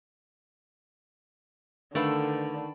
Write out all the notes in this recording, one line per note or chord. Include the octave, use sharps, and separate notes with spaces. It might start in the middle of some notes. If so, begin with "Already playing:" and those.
D3 D#3 A3 D4 A4 B4 F5 B5